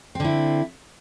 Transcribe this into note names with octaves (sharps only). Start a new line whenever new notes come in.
D3 C4 E4